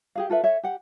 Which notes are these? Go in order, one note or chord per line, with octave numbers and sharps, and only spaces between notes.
G4 G#4 F5
F4 A4 B4 E5
A4 C#5 E5
G4 F#5